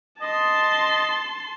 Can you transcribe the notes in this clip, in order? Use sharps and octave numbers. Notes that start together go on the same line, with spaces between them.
D#5 A5 C6